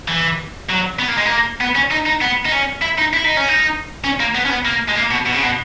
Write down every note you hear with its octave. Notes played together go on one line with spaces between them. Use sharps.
E3
F#3
B3
A#3
G#3
A#3
B3
C#4
D#4
D#4
B3
D#4
C#4
E4
D#4
E4
D#4
C#4
D#4
C#4
A#3
B3
C#4
B3
A#3
G#3
A#3
B2
B2
C#3
B2